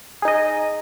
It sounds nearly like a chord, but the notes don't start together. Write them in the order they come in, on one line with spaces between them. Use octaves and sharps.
G#4 D#4 D#5